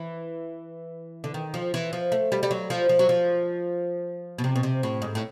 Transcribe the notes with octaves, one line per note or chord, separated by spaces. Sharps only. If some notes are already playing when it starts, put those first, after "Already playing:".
Already playing: E3
D3
D#3
F3
E3
F3
A3
G3
G3
F#3
F3
F3
F#3
F3
B2
C3
B2
C3
A2
G#2
A2